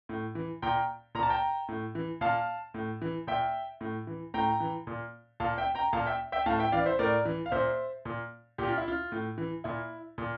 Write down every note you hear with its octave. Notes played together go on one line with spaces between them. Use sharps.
A2
E3
A#2 G5 A#5
A#2 A#5
A5
G5 A#5
A2
E3
A#2 F5 A5
A2
E3
A#2 E5 G5
A2
E3
A2 G5 A#5
E3
A#2
A#2 F5 A5
E5 G5
G5 A#5
A#2 F5 A5
E5 G5
E5 G5
A2 F5 A5
E5 G5
E3 D5 F5
C5 E5
A2 A#4 D5
E3
F5
A#2 C5 E5
A#2
A#2 G4
F4
E4
F4
A2
E3
A#2 E4
A#2